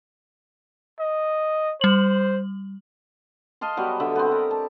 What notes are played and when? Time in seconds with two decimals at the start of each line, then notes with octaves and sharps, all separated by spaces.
1.00 D#5
1.81 G3 C5 F#7
3.61 D#5 F5 A5 C6
3.77 F#3 G3 B3
4.00 D3 E5
4.16 B3 C4
4.31 A#4
4.51 A5